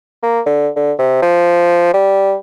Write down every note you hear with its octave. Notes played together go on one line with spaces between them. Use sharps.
A#3
D3
D3
C3
F3
G3